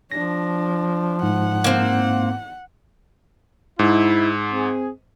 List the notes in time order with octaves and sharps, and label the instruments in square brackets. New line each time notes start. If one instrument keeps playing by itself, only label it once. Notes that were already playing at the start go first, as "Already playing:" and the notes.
[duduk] F3 [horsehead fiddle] D4 [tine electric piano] A#6
[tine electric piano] G#2 [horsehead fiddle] F#5
[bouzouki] A#3 C4
[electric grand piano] G#2 [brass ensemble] E4
[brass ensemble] C4 G#4